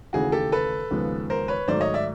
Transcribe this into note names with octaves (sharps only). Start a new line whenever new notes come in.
D#2 C#3 E3 A3 F#4 G#4
G4 A4
A4 B4
D#2 C#3 F3 G#3 B3
A#4 C5
B4 C#5
G#2 D#3 F#3 A3 C5 D5
C#5 D#5
D5 E5